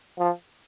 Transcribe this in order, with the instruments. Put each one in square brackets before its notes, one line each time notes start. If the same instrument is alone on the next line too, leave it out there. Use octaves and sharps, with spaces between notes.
[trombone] F3